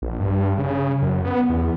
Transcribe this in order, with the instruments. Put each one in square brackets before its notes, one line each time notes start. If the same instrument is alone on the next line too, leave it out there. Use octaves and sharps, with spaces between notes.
[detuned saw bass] A#1
G2
C#3
F#2
B3
E2